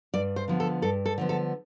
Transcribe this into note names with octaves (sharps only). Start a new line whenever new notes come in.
G2 D5
C5
D3 F3 B3
A4
G2 A4
A4
D3 F3 B3
A4